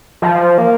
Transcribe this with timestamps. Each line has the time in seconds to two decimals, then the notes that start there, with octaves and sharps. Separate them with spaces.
0.22 F3
0.58 A#3